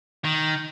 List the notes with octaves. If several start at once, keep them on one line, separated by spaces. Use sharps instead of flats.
D#3